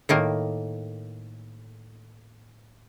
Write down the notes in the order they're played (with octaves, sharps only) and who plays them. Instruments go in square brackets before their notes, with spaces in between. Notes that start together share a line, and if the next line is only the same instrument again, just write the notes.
[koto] A2 D#3 A#3